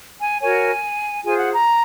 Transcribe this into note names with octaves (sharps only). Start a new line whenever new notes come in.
G#5
F#4 A#4 C#5 G#5
F4 G#4 C5 G#5
F#5
A#5